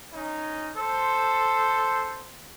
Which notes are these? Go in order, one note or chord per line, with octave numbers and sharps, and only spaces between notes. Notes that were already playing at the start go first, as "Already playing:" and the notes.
C#4 D#4
A4 C5